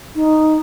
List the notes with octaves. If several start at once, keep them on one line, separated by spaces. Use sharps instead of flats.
D#4